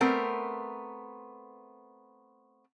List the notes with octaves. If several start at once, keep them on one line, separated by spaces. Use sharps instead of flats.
A3 B3 C4 A#4